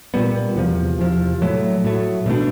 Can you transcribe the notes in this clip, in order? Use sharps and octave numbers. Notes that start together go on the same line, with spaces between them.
A#2 G3 B3
E2 C3 F3
E2 C3 F3
A2 F#3 A3
A2 F#3 A3
B2 F#3 A3 D4